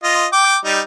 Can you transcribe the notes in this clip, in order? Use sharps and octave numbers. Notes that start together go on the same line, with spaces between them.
F4 D#5
G5 D6
G3 D#4